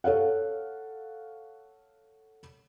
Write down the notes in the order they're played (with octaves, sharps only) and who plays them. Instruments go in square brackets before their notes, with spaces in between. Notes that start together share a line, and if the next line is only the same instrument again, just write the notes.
[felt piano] A4 C#5 F5 F#5